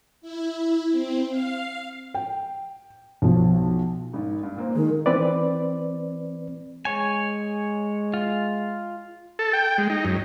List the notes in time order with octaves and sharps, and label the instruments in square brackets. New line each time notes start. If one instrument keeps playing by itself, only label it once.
[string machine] E4
C4
F5
[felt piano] G5
B1 F3
G#1 D#3
G2
A#2 A#3 C4
[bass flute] D#3 [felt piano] G#3
[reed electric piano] E3 C4 B4 D5
[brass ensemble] G#3 [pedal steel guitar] C#5 G#5
[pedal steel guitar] F4
[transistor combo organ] A4
G5
G#3
D#4
F#2